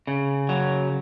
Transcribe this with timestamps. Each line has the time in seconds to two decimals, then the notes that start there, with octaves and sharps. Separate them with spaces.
0.07 C#3
0.49 F#3